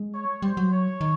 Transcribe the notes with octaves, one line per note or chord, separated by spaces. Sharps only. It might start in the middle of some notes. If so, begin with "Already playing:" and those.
Already playing: G#3
C#5
G3 C5
F#3
C#5
D#3